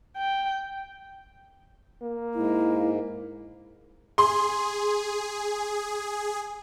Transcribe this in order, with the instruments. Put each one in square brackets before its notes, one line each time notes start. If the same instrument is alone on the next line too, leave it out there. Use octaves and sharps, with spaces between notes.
[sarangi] G5
[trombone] A#3
[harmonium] G#2 [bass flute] E4
[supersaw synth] G#4 [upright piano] C6